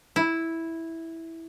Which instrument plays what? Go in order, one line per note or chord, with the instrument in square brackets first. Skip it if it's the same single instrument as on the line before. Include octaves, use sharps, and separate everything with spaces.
[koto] E4